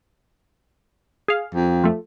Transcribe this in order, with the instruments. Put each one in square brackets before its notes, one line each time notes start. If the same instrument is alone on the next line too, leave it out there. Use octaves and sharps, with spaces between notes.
[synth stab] G#4 F5
[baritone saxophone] F2
[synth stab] F3 A3